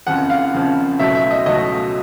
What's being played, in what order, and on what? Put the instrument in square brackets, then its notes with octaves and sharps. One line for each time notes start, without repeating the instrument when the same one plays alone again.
[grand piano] F#1 F2 C#3 F3 F#5
F5
F#1 F2 C#3 F3
C#2 B2 F#3 A3 E5
E5
D#5
C#2 B2 F#3 A3 D#5